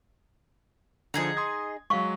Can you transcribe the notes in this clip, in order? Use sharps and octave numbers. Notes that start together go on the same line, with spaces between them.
D3 F3 D#4 G#4 D#5
C6 D#6 G#6
F#3 G#3 F5 C#6